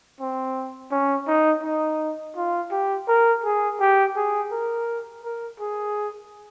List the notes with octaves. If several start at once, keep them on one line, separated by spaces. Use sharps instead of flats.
C4
C#4
D#4
D#4
F4
G4
A#4
G#4
G4
G#4
A#4
A#4
G#4